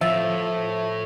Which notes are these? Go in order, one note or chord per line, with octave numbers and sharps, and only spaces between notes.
A2 F3 E5